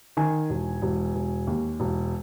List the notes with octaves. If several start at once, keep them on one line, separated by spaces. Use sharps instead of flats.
D#3 G#5
E1
E1
E1
D#2
E1